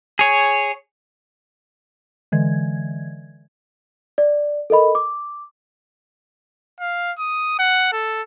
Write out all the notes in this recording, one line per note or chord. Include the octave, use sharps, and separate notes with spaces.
G#4 C#5
D3 E3 G#3 G#6
D5
A4 A#4 D#5 B5
D6
F5
D#6
F#5
A4